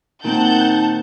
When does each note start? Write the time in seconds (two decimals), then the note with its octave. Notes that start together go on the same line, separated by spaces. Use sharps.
0.24 A#2 D#3 C4 F#5 A5 G6